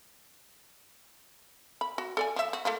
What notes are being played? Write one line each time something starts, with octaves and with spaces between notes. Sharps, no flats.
B5
F#4
A4 D5 G#5
F3 E5
F#4
A3 A#3 F4